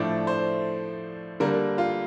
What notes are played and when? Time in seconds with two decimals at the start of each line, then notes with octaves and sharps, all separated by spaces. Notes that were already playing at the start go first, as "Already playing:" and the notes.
Already playing: A2 F3 A3 D4 D5
0.27 C5
1.40 D3 G3 A#3 A#4
1.78 F4